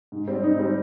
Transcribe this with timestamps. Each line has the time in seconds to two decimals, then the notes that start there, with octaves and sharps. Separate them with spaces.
0.12 G#2
0.28 G3 C4
0.43 G#2 D#4
0.59 G3 C4